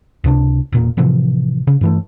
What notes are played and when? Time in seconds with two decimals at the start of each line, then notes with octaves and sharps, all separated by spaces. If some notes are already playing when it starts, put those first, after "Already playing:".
0.24 C#2 C3 D4
0.72 E1 A#2 A#3
0.97 A2 C3 E3 F3
1.67 C#3
1.81 G2 E3 A3